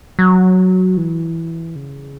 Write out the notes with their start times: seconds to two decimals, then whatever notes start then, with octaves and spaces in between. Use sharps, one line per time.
0.19 F#3
0.97 E3
1.76 C#3